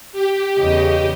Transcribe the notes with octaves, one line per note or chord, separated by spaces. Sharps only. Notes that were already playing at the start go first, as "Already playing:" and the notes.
G4
E2 C#3 D#5